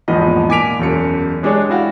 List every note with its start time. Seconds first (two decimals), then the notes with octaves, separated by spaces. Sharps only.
0.08 A#1 E2 G#2 F3 D#5 B5
0.49 A#2 G#5 D6 B6 D7 F7
0.79 E1 F#2 C#7
1.43 G#3 D4 G4 G#4 C#5
1.70 E4 F#4 F5 G5